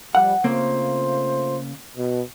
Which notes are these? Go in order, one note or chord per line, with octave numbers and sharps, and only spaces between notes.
F3 G3 F#5
C#3 A3 A#3 C4 F4 C5
B2